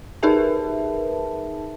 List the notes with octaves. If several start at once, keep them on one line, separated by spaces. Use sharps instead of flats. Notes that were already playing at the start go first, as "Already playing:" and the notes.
D#4 G#4 A#4 B4 E5 A5